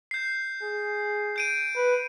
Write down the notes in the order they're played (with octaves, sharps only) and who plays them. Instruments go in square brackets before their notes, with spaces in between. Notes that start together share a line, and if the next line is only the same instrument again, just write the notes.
[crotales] G6 C7
[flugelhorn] G#4
[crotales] G6 D7 D#7
[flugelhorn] B4